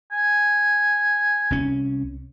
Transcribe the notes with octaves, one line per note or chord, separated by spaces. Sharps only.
G#5
C2 C#4